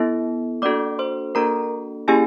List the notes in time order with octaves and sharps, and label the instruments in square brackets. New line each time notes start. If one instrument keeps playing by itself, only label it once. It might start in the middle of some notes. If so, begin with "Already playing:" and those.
Already playing: [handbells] B3 E4 A4
A#3 D4 F#4 A4 D5 D6
C5 C6
A#3 D4 F#4 A4 A#4 A#5
A#3 C#4 E4 G4 G#4 G#5